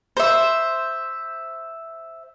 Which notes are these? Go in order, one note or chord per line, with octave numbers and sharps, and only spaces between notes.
C5 E5